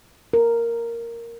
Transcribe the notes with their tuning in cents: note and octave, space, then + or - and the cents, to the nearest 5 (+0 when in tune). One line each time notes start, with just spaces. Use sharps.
A#4 -5